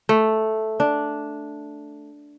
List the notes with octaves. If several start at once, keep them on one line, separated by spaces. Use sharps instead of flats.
A3
D4